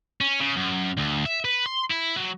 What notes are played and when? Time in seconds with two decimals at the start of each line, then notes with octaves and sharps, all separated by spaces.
0.21 C#4
0.40 C#3
0.57 F#2
0.98 D2
1.25 E5
1.45 B4
1.66 C6
1.91 E4
2.16 F#3